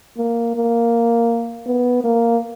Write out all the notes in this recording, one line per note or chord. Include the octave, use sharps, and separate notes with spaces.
A#3
A#3
B3
A#3